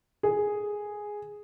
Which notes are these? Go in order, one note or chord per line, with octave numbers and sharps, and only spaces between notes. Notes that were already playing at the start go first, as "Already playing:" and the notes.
G#4